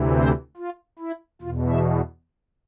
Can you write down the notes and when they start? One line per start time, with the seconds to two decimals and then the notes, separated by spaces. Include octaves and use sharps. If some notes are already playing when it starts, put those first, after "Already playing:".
Already playing: D2 C3 E3
0.15 C5
0.57 F4
0.99 E4
1.42 E2 B2 F4
1.70 E5